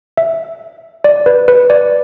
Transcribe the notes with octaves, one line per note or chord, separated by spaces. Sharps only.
E5
D5
B4
B4
D5